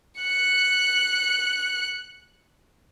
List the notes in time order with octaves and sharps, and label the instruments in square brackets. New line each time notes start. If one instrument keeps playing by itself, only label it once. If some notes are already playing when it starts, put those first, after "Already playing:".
[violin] F#6 C#7